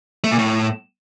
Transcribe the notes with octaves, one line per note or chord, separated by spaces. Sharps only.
A3
A#2
A2